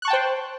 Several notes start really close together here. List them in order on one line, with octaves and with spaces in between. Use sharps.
F#6 C#6 A5 G5 C5